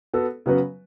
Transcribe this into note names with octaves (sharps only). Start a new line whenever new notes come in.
B3 F#4 A4
C#3 F#3 B3 F#4 B4